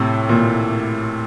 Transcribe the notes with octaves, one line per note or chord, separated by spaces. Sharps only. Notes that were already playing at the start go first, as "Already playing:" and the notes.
Already playing: A2 C3
A#2